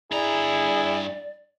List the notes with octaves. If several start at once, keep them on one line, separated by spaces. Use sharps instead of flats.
G2 E4 G#4 D5 A#5